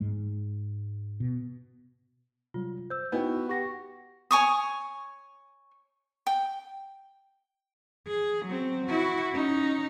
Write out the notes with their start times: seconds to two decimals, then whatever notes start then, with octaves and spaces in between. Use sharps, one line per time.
0.01 G#2 G#3
1.20 B2
2.54 C3 F#3 G3 F4
2.90 C5 E6 G6
3.12 B3 D#4 E4 F#4 D#5 G5
3.49 G4 F#5 G5 C#6 A#6
4.31 C#5 G#5 C#6 D#6
6.27 G5
8.07 G#4
8.45 F#3 C4
8.85 E4 F#4
9.32 C#4 D#4